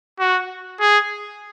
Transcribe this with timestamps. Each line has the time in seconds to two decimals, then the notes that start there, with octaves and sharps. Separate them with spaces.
0.19 F#4
0.80 G#4